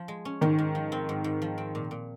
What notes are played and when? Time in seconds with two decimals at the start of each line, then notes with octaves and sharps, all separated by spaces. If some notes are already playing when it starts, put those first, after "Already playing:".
Already playing: F3
0.08 G#3
0.25 C#4
0.41 G#2 D#3
0.59 G#2
0.75 F3
0.92 C4
1.09 G#2
1.24 G#2
1.42 F3
1.58 C4
1.75 A#2
1.91 A#2